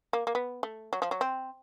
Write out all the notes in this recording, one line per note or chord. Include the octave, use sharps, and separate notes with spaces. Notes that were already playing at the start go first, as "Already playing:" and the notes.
A#3
A#3
B3
A3
F#3
F3
F#3
C4